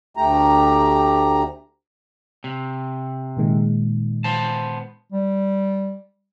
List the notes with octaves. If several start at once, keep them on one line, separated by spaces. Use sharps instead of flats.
D2 A3 G4 A#5
C3
A#2 D#3 G#3
B3 C5 A5
G3